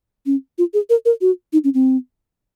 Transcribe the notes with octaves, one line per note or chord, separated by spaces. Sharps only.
C#4
F4
G#4
A#4
A#4
F#4
D#4
C#4
C4